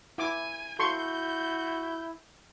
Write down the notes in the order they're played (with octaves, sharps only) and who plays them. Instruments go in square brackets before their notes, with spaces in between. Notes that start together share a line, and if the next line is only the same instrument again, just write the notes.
[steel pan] E4 D6 [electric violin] G#5
[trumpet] E4 [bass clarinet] F#4 [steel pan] A4 C6 C#6 [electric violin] G6